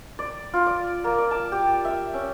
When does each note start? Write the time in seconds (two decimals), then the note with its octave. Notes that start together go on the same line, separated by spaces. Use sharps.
0.19 D5
0.54 F4
0.66 D5
1.04 A#3
1.18 D5
1.31 A5
1.52 G4
1.85 E5
2.14 C#4